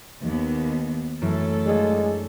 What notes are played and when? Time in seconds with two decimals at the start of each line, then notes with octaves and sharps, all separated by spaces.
0.23 D#2 D#3 B3
1.22 F#2 E3 A3 A4
1.66 G#3 D4 G#4